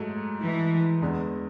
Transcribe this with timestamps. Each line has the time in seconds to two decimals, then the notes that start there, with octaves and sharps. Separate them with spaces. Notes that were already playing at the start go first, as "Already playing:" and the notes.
Already playing: G#2 F#3 A3
0.41 E3
1.02 E2 D3 G#3 B3